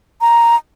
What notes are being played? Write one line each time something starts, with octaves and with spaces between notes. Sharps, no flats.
A#5